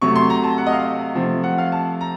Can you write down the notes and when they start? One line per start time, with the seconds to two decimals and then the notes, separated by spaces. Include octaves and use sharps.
0.02 C3 F#3 A3 C#6
0.16 C6
0.30 A#5
0.44 A5
0.58 F#5
0.66 D#5
0.73 F5
1.15 C3 F3 A3
1.44 F#5
1.58 F5
1.72 A5
2.01 A#5